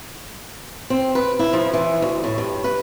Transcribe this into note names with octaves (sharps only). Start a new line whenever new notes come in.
C4
B4
E4
F3
E3
D2
A2
G2
B4